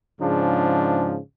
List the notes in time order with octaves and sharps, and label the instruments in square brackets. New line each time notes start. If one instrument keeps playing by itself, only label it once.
[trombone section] G#2 C#3 F3 D4